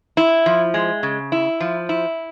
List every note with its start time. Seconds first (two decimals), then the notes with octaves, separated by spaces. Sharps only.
0.17 E4
0.46 F3
0.74 G#3
1.03 C#3
1.32 E4
1.60 F3
1.89 E4